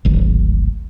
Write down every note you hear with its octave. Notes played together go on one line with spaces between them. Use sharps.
D1 G#1